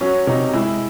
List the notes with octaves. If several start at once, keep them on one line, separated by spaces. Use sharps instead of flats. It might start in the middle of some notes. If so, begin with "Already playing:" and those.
F#3 C#4
C3 D#4
G#3 E4